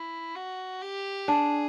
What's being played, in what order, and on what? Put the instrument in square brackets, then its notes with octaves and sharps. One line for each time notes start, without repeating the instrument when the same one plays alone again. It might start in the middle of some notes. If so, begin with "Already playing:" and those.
Already playing: [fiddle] E4
F#4
G4
[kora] D4 [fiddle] G#4